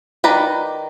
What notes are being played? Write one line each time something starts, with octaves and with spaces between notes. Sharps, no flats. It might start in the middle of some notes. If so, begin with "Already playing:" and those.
D#3 B4 D5 A#5